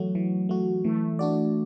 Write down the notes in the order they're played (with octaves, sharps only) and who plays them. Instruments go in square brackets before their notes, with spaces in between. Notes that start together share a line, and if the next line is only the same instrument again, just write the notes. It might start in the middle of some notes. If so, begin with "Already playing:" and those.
Already playing: [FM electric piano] E3 A3 F#4 [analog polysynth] F#3
[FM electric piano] E3
A3 F#4
[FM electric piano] E3 [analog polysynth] A3
[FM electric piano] D4 F#4 D5